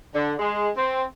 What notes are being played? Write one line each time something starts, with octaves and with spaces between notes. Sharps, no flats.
D3
G#3
C4